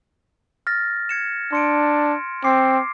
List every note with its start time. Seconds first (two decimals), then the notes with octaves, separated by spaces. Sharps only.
0.67 F6 A6 A#6
1.09 G#6 C#7 E7
1.53 D4 C6 C#7 D7
2.44 C4 D6 C7